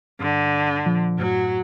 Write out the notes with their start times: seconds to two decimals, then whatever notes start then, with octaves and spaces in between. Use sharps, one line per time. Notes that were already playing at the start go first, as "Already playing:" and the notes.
0.20 G2 D3
0.86 A#2 F3
1.18 F#2 A2 F#3